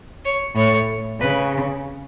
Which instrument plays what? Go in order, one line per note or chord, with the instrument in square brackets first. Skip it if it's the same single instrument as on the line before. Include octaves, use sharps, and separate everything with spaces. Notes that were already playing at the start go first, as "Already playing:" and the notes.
[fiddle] C#5
[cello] A2 [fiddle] C#5
[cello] C#3 [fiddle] B4